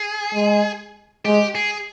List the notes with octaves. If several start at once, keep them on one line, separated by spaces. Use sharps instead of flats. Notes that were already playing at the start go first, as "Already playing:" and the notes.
Already playing: G#4
G#3
G#3 G4
G#4